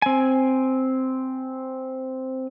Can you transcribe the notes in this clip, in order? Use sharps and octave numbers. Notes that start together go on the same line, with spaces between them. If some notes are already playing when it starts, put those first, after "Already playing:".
C4 G#5